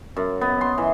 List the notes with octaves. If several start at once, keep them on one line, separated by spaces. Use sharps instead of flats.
F#2
B3
C6
E3